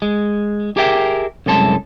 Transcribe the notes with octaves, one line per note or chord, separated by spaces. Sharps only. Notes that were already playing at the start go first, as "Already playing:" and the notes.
G#3
G4 G#4 A#4 E5 G5
C2 F#2 G#3 A4 A5 C6